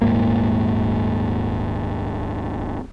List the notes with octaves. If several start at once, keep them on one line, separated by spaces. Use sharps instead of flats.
D#1 G#2 A#3